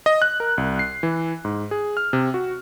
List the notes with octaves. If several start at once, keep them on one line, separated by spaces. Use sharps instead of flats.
D#5
F#6
A#4
C2
C7
E3
G#2
G#4
F6
C3
F#4